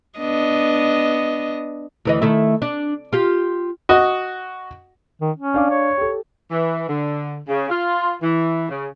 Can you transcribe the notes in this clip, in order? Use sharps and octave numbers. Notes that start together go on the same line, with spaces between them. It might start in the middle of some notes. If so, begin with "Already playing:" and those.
B3 D4 D#5
D2 E3 D#5
D#3 A3 E4
D4
F4 G4
F#4 D#5
D#3
C#4
D4 F5 D6
C#5
G4 A4
E3
D3
C#3
F4
E3
C#3